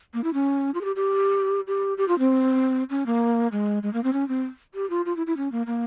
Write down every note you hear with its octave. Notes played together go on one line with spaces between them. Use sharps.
A#3
E4
C#4
F4
G#4
G4
G4
G4
G4
F4
C4
C#4
A#3
G#3
G#3
A#3
C4
C#4
C4
G4
F4
F4
E4
E4
C#4
A#3
A#3